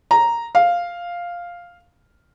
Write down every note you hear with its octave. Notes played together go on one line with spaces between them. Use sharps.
A#5
F5